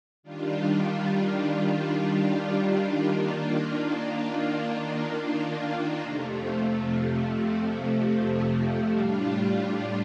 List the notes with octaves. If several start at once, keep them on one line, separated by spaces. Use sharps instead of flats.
D#3 G3 D4 F4
D#3 A#3 D4 F4
F2 C3 F3 A3
A2 G3 D4 F4